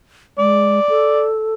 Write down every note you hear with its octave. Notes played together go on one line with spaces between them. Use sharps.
G#3 D5
A4